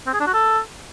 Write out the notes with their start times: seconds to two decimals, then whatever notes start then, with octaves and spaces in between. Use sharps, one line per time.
0.07 C4
0.13 G#4
0.20 D4
0.27 F#4
0.33 A4